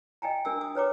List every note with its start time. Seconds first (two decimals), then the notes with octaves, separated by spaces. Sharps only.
0.22 D#5 G5 G#5 A#5
0.45 D4 A#4 G#5 E6
0.61 D#6
0.75 B4 C#5 A#5 D6